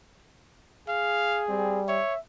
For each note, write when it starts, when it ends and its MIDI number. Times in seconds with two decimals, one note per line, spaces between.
0.88 1.83 68
0.88 1.44 77
1.49 2.00 55
1.49 1.79 60
1.88 2.14 73
1.88 2.19 76